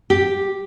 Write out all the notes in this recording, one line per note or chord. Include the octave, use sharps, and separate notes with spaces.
G4